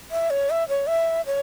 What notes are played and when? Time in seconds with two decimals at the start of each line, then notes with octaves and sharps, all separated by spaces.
0.11 E5
0.30 C#5
0.50 E5
0.68 C#5
0.87 E5
1.26 C#5